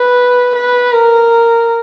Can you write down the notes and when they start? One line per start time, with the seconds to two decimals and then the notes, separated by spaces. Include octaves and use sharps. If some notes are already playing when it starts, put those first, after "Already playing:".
Already playing: B4
0.55 B4
0.92 A#4